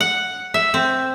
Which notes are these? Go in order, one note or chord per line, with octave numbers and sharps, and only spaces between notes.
F#5
E5
C4